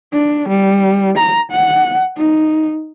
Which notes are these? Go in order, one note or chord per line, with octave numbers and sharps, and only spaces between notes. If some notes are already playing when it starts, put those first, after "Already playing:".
D4
G3
A#5
F#5
D#4